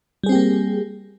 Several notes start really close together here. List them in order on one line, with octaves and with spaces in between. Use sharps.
G3 G#4 C4 G4 A#3